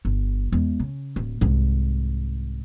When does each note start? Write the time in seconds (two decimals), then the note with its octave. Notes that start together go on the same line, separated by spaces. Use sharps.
0.05 G1
0.52 E2 G#3
0.80 C#3
1.16 D1
1.41 C2 G#2